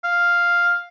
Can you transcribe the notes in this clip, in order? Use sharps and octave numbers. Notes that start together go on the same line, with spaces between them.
F5